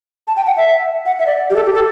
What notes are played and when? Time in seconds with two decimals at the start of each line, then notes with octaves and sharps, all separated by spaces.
0.28 A5
0.37 G5
0.46 F#5
0.57 E5
1.06 F#5
1.19 E5
1.26 D5
1.50 G4
1.56 A4
1.65 G4
1.75 A4